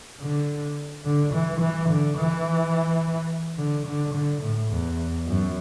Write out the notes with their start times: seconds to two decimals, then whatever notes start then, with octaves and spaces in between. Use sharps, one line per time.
0.21 D3
1.06 D3
1.34 E3
1.61 E3
1.89 D3
2.18 E3
3.58 D3
3.87 D3
4.15 D3
4.43 A2
4.71 E2
5.27 F#2